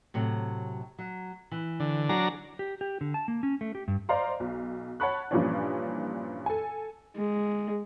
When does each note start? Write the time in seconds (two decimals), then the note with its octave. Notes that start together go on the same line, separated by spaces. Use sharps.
0.14 A2 C3 F#3
0.99 F#3
1.51 E3
1.80 D3
2.09 F#3 D4 G#4 A#5
2.59 G4
2.81 G4
3.01 D3
3.14 A5
3.28 A#3
3.43 C#4
3.61 A3
3.75 G4
3.88 G2
4.09 C5 D5 D#5 F5 A#5 C6
4.40 B1
5.00 C#5 F#5 A5 B5 C#6 F#6
5.31 G2 A#2 E3 F3 C#4 D4
6.46 A4 G#5
7.17 G#3